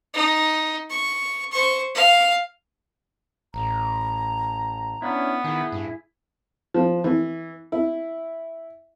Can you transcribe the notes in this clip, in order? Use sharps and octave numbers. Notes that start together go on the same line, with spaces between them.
D#4
C#6
C5 C#6
F5
A1 A#5
B3 C#4 D4 E4
D#3 E4 G#4
G2
F3
E3
E4